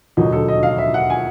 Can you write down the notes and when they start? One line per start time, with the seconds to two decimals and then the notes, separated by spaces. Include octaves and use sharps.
0.17 E1 D#2 D3 F#3 D#4
0.33 A4
0.48 D#5
0.63 F5
0.78 E5
0.94 F#5
1.10 G#5